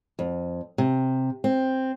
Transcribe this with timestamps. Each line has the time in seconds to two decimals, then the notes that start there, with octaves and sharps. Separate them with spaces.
0.19 F2
0.78 C3
1.44 C4